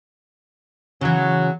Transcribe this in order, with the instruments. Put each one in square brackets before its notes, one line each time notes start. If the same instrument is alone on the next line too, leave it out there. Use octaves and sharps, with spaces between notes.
[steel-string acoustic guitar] C#3 E3 [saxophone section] F#3